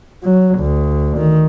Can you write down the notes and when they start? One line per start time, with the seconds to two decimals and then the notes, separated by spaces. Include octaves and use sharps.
0.23 F#3
0.58 D2
1.17 D#3